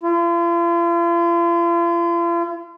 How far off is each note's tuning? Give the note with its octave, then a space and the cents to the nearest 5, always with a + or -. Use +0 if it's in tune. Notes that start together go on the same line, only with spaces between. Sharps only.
F4 -40